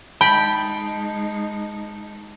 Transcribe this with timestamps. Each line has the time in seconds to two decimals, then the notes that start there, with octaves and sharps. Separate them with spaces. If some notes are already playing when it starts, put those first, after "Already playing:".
0.21 G#3 D#4 G5 A5 B5